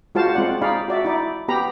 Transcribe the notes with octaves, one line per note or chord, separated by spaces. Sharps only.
G#3 F4 F#4 C5 F5 A5
G#3 C4 F4 D5 F#5
D#4 G#4 D5 F5 B5
F#4 D5 E5
D#4 E4 D5
B3 G4 A#5 B5